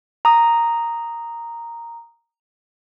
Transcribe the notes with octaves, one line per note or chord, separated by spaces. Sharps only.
A#5 D#6